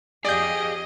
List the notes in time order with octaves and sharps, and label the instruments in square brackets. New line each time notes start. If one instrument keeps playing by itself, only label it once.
[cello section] F2 G4 F5 [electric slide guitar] G#4 [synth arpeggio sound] D5 G6 [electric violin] D#5